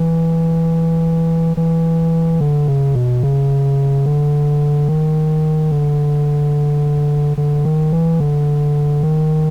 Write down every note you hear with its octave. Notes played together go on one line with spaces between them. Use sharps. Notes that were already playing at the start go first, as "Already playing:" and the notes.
Already playing: E3
E3
D3
C#3
B2
C#3
D3
D#3
D3
D3
D#3
E3
D3
D#3